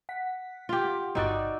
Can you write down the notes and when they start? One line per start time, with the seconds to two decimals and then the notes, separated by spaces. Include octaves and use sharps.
0.09 F#5 B6
0.69 F4 G4
1.15 G1 D#4 F#4 D5 E6